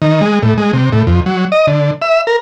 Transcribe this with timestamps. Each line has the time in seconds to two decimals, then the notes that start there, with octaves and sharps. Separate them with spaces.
0.02 D#3
0.21 G#3
0.42 A2
0.58 G#3
0.73 C3
0.93 A2
1.07 F2
1.26 F#3
1.52 D#5
1.67 D3
2.02 E5
2.27 A#4